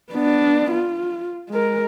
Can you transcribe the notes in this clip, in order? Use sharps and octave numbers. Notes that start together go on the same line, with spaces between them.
B3 D4
F4
G#3 A#4